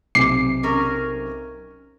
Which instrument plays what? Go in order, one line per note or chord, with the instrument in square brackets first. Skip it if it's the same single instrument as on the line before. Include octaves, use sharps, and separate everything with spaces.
[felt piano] B1 C3 D6 [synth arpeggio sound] C7
[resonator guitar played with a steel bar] C#4 A#4